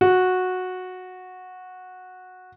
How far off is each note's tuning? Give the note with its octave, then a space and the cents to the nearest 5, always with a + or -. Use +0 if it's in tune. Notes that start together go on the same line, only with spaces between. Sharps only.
F#4 -10